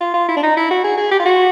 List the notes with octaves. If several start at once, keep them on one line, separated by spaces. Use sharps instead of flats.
F4
F4
E4
D4
D#4
E4
F#4
G#4
G#4
G4
F4
F#4